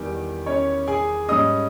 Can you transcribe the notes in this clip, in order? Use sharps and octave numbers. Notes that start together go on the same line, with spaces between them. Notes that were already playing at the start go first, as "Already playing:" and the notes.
Already playing: E2 D#3 G3 G4 G5
C#4 C#5
G#4 G#5
G#2 G3 C#4 D#5 D#6